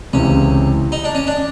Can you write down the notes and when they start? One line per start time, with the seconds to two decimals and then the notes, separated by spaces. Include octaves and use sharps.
0.13 C#2 C3 E3 C#4
0.92 D#4
1.04 D4
1.15 C#4
1.27 D4